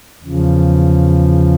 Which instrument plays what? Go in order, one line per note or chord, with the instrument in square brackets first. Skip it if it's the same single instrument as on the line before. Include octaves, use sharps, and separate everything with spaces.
[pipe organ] E2 C#3 F3